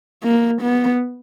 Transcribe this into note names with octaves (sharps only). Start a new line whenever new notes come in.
A#3
B3